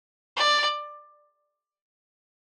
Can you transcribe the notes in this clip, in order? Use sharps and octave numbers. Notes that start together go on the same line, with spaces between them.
D5